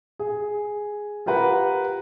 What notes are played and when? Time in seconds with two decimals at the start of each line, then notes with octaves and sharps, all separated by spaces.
0.19 G#4
1.26 F4 G4 A#4 B4 F#5